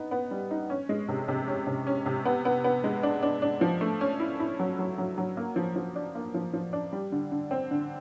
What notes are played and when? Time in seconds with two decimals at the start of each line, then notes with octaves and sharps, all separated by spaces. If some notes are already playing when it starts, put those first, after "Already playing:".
Already playing: B3 D#4
0.11 B3
0.31 G3
0.51 D#4
0.70 C#4
0.89 G#3
1.09 C3
1.28 C3
1.48 C#4
1.67 C3
1.87 C#4
2.06 C3
2.25 B3
2.45 B3
2.64 B3
2.84 G#3
3.03 D4
3.23 D4
3.42 D4
3.61 F3
3.81 A3
4.01 C#4
4.20 E4
4.40 E4
4.60 F#3
4.79 F#3
4.98 F#3
5.18 F#3
5.37 A#3
5.56 F3
5.76 F3
5.95 D4
6.15 A#3
6.34 F3
6.53 F3
6.73 D4
6.93 G3
7.12 D3
7.32 D3
7.51 C4
7.71 D3